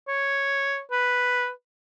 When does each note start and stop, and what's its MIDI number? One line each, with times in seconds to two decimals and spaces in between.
0.08 0.81 73
0.91 1.50 71